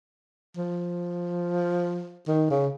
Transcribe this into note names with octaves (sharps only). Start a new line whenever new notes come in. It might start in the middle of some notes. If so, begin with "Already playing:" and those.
F3
D#3
C#3